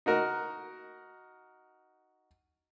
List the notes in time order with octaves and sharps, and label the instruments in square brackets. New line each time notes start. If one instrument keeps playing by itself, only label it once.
[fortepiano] D#4 F#4 A#4